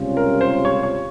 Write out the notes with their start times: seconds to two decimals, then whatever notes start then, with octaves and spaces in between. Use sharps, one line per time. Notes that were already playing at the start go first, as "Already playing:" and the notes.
Already playing: C#2 C3 G3 C#4 F4
0.17 A#4
0.41 C5
0.65 C#5
0.83 C#5